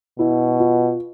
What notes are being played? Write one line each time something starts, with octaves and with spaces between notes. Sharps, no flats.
B2 E4
F4